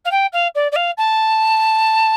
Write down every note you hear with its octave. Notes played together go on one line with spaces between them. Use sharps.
F5
G5
F5
D5
D5
F5
A5